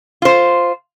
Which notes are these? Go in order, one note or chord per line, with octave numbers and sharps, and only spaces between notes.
F4 C5